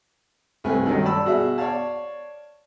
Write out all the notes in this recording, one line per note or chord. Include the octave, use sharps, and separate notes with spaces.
C2 A3 B4 G#5
G2 D#3 F#3 A3 D#4
D5 A5 B5 E6
B2 F#4 G#4 E5
C#5 D5 F5 A5